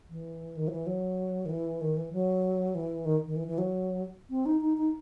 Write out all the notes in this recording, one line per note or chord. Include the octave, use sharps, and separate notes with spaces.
E3
D#3
F#3
E3
F#3
D#3
E3
D#3
E3
F#3
E3
D#3
D#3
E3
E3
F#3
C4
D#4
D#4
D#4